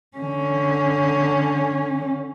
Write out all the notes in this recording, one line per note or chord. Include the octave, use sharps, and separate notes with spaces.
D3 C#4